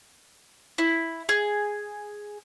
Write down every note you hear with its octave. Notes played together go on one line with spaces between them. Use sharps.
E4
G#4